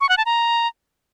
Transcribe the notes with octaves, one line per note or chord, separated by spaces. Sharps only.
C#6
F#5
A5
A#5